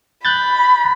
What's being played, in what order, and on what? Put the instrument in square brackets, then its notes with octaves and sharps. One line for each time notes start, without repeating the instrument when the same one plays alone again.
[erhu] B5 [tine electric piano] F#6 G6 A6